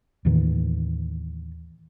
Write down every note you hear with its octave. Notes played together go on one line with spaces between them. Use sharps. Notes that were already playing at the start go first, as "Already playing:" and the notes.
D#2 A2 D#3 E3